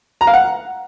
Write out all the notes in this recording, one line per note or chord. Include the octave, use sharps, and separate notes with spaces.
A#5
F5
F#5